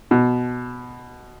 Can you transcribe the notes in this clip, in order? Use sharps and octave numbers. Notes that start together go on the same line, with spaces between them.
B2